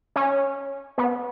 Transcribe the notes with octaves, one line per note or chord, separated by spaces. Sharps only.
C#4
B3